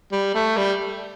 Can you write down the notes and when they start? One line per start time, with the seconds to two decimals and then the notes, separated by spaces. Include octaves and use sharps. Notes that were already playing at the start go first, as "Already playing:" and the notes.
0.12 G3
0.35 A3
0.57 G3